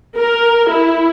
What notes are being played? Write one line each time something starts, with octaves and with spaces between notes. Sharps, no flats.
A#4
E4